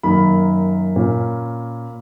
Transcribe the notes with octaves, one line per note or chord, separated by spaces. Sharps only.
F#2 D#3 A#3 B5
A#2 A#3 C#4